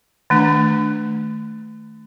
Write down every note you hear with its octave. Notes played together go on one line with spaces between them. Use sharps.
D#3 A3 D4